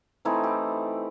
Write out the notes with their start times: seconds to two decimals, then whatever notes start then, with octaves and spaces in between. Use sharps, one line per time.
0.25 E3 A3 C4 D#4 E4
0.44 G4